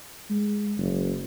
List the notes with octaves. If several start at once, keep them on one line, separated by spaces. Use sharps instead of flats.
G#3
F#1